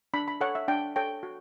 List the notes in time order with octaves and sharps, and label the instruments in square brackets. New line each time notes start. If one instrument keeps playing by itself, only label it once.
[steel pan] D4 B5
B5
A4 C#5 F#5
E5
D4 G5
A4 C#5 G5
F#4